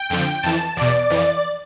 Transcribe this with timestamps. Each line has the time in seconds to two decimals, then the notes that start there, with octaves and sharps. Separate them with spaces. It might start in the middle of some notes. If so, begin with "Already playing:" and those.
Already playing: G5
0.10 F2 D3 F3
0.43 F2 E3 A5
0.77 E2 B2 D5
1.10 F2 E3